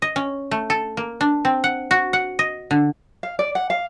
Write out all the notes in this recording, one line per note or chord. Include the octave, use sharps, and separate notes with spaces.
D#5
C#4
A3
A4
A#3
D4
C4
F#5
F#4
F#5
D#5
D3
F5
D5
F#5
F5